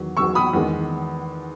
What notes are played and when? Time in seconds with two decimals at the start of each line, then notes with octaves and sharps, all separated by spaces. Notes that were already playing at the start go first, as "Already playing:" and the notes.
Already playing: E2 D#3 F#3
0.17 E2 D#3 F#3 C#6 E6
0.35 B5 D#6
0.53 E2 D#3 G#3